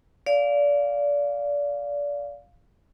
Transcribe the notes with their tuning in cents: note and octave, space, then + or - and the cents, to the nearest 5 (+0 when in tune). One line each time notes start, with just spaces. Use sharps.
D5 -25 F5 +5